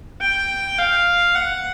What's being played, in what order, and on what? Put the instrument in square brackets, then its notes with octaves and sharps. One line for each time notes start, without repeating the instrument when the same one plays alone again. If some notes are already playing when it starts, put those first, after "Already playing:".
[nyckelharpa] G5
F5
F#5